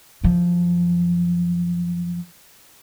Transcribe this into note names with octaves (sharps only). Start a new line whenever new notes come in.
F#2 F3